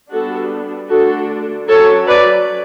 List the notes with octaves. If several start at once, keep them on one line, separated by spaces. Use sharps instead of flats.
G3 B3 D4 F#4 A4
D3 A3 D4 F#4 A4
F#3 C#4 A4 C#5
B4 D5